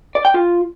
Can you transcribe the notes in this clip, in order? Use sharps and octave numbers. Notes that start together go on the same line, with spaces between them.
D5
G5
F4